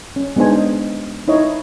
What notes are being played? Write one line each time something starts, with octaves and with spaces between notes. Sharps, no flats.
C#4
G#3 B3 D4 D#4 C5 G#5
D#5
D#4 E4 C#5 D#5